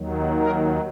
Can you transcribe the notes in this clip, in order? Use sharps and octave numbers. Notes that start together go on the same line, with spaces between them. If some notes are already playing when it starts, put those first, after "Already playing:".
Already playing: D#2 D#3 F#3
A#4